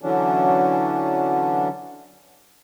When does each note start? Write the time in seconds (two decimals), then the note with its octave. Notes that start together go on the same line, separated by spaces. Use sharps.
0.02 D3 E3 F#3 C#4 D4